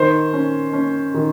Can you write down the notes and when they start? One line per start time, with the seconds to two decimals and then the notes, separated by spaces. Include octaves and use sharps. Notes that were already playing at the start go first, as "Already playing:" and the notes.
Already playing: D#3 C5
0.33 C#4
0.73 C#4
1.14 D#3